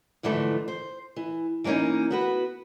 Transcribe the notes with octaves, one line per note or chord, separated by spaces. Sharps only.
G#2 D3 E3 F3 G3 A3
C5
E3
E3 A#3 B3 C#4 D#4
B3 F#4 B4